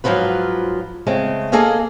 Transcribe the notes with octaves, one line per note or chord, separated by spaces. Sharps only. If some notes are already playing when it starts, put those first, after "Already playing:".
G#2 B2 F3 F#3 F4 B4
C#3 G#3 A3 C4
A#3 G#4 A4 D#5 F5 G#5